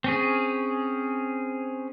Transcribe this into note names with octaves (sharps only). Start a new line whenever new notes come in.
C4 C#4 G#4